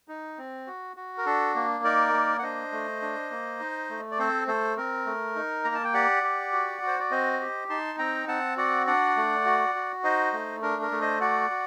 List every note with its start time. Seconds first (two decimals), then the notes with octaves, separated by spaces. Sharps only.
0.08 D#4
0.38 C4
0.67 F#4
0.97 F#4
1.18 A#4
1.26 D4 A4
1.55 A#3
1.84 D#4 A#4 D5
2.13 A#3
2.39 F#5
2.43 D4 C5 D#5
2.72 A3
3.02 D4
3.31 A#3
3.60 D#4
3.90 A3
4.11 D5
4.18 C4 A4 C5
4.47 A3 A4 C5
4.77 C4 A#4
5.06 A3
5.35 D#4
5.65 A#3 A#5
5.75 A5
5.84 G5
5.94 G4 D5 F#5
6.23 G4
6.53 F#4
6.82 F#4
6.87 C5
7.00 D5
7.11 C4 C5 D#5
7.40 G4
7.70 D#4 A5 C6
7.99 C4 G5 A#5
8.28 C4 F#5 A5
8.57 F#4 D5 F#5
8.87 D4 D5 F#5
9.16 A3
9.45 F#4
9.75 F#4
10.04 D#4 C5 D#5
10.33 A3
10.62 D4 A#4
10.82 A#4
10.92 A3
11.01 C5 D#5
11.21 F#4 D5 F#5
11.50 F#4